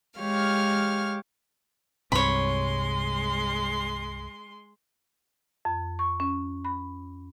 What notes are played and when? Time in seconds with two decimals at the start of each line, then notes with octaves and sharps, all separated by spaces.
0.20 G#3 G4 C#5 F5 F6
2.12 C2 G2 C3 G#3 C#5 B5 C6
5.65 F2
5.99 C#6
6.20 C#4
6.65 B5